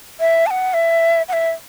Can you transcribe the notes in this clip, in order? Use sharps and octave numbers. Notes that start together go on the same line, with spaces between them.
E5
A5
F#5
E5
F#5
E5